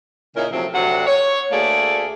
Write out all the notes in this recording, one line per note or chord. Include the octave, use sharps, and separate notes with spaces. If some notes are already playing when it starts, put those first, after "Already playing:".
A#2 C#3 C#4 D#4 E4 A#4
C3 F3 F#3 A3 C4
D2 C3 F#3 D4 F#5
C#5
D2 A3 A#3 G#4 A4 D5